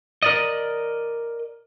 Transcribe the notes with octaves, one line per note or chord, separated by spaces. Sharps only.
A#4 D5 D#5